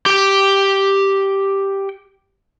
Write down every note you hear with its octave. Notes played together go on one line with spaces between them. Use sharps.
G4 G5